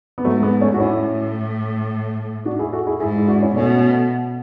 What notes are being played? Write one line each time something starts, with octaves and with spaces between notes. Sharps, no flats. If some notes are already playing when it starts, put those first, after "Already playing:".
B3
G#2 F#3 A3
G#3 B3
A3 C#4
F#4
A2 C#4 E4
D4 F#4
E4 G#4
F#4 A4
E4 G#4
G#2 E4 G#4
E4
D4 F#4
C#4 E4
B2 A3 C#4